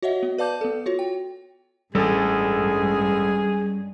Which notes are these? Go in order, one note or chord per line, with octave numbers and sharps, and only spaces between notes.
F#4 C#5 D#5 E5 F#5
B3
B4 D5 F5 A5 D6 G6
B3 A4
F4 F#4 C#5
G5
A1 G2 G3 G#3 C#4 G#4 A4 G#5